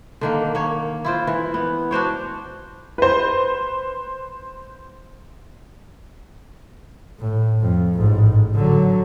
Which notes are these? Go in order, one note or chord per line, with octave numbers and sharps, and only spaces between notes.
D3 D#3 A#3
A#3 C#5
E4 F4 C5
E3
B3
D4 F#4 C5 C#5
B4 C5
A2
F2
A1 G#2
D3 F#3